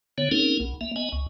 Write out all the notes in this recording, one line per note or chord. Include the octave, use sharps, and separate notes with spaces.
D3 B3 C#5
A#3 C4 C#4 D#4 G#4 A#4
B1
A#3 E5
B3 D#5 G#5
C#2